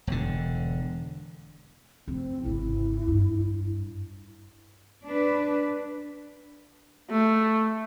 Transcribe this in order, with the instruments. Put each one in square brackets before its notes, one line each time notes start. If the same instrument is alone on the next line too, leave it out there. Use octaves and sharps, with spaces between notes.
[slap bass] E1 D3
[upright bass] F1 [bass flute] C4
[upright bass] G#1 C#3 [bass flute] E4
[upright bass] G2
[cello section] D4 B4
[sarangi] A3